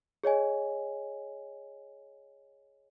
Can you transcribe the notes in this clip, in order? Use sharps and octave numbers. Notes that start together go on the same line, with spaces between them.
G#4 C#5 D#5 G#5